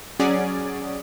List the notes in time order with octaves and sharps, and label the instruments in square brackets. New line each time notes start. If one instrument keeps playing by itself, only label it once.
[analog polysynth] F#3 C#4 G#4 D5